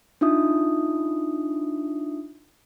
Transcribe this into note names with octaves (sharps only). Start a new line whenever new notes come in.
D4 D#4 F4 E5 D#6